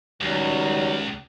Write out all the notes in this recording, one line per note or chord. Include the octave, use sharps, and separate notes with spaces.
C#2 D#3 F#3 G3